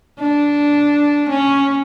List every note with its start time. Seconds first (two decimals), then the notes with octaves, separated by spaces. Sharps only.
0.20 D4
1.29 C#4